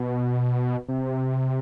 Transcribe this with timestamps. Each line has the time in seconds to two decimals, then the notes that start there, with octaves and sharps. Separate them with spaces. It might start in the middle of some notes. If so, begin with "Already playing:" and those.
Already playing: B2
0.88 C3